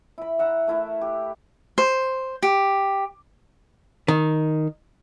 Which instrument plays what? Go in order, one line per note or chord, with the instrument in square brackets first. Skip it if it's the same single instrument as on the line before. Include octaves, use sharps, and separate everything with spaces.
[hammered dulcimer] E4 B5
E5 F#5 A#5
A3 E4 A#4
G4
[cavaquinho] C5
G4
[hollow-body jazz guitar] D#3